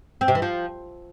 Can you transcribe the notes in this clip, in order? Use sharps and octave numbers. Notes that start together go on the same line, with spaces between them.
C4
C3
E3
F3